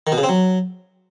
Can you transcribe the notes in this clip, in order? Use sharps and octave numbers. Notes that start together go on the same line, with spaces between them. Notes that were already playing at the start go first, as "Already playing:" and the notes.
D#3
B2
C#3
C4
F#3